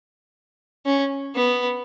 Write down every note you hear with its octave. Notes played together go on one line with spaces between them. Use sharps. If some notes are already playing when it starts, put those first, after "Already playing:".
C#4
B3